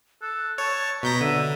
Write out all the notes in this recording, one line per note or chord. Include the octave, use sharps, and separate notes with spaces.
A4 F#6
C#5 A5 C#6
B2 A#5 B5 G6 A#6
D3 E5 D#7